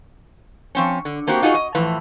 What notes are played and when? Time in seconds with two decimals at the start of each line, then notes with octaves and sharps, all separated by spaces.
0.75 F3 C4 C#4
1.05 D3
1.27 A3 A#3 C4 F#4 G4
1.42 D#4 F4 F#4 G#4 D#5
1.54 D#5
1.75 A2 E3 F3